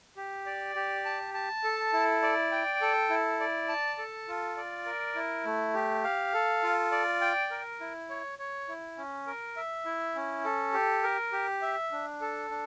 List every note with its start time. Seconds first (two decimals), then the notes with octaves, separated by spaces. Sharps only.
0.16 G4
0.46 D5
0.76 G4
1.05 A5
1.34 A5
1.64 A4
1.93 E4
2.22 D5
2.52 G5
2.81 A4
3.10 E4
3.40 D5
3.68 A5
3.98 A4
4.28 F4
4.57 D5
4.86 A#4
5.15 E4
5.45 A3
5.74 G4
6.04 F5
6.34 A4
6.63 F4
6.92 D5
7.21 G5
7.51 A#4
7.80 E4
8.09 C#5
8.39 C#5
8.68 E4
8.98 C#4
9.27 A#4
9.57 E5
9.86 E4
10.16 C#4
10.45 A4
10.74 G4
11.03 A#4
11.32 G4
11.62 E5
11.92 D4
12.21 A4
12.51 D4